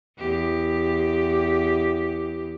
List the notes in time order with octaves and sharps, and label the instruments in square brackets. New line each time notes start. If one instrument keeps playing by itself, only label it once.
[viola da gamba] E2 G4